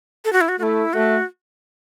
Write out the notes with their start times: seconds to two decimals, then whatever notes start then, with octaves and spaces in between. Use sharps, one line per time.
0.25 A4
0.33 F#4
0.41 E4
0.49 F#4
0.59 A3 E4 F#4
0.93 A3 F#4